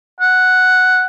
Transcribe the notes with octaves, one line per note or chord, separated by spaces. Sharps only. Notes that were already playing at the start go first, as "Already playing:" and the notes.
F#5